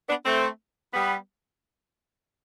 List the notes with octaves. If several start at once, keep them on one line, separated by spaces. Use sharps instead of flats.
B3 D4
A3 C4
G3 B3